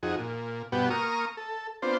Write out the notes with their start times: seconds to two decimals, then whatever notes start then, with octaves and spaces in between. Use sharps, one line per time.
0.03 F2 D#4 F#4 G#4
0.19 A#2
0.72 G2 B2 B3 F#4 G5
0.90 A#3 A#5 C#6 D#6 F6
1.37 A4
1.82 B3 C4 D4 F4 C5